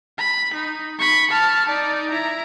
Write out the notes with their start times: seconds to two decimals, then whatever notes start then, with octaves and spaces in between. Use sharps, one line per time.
0.18 B5
0.54 D#4
0.99 B5 C#6
1.31 A5 F6
1.68 D#4 D5
2.11 E4 A#5